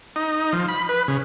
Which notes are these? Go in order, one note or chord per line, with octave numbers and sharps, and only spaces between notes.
D#4
F3
B5
B4
C#3